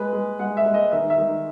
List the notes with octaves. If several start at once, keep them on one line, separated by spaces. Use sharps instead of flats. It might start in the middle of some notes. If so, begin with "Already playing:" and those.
Already playing: G#3 B4
G#3
G#3 F#5
E5
G#3
D#5
D#3 E5
E5
D#3